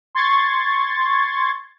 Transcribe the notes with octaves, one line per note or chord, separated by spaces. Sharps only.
C6 C#6 G#6 A6